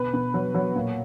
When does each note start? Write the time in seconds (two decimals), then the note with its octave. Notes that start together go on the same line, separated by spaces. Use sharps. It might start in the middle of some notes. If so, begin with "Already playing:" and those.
Already playing: B2 D3 B4
0.14 B2
0.34 F#3
0.54 F#3
0.76 A#2